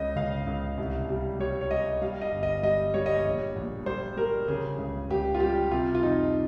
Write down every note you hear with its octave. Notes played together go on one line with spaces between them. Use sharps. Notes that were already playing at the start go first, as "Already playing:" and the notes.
Already playing: C#2 C#3 D#5
C#2 F5
C#2
C2
G3
G3 C#5
C#5
G3 D#5
G3 F5
D#5
G1
D#5
G3 D#5
G3 C#5
D#5
C#5
A#1
A#1
G3 C5
G3 A#4
C#3 G#4
C#2
C#2 G4
F4
G3 G4
C3 F4
F4
F2 D#4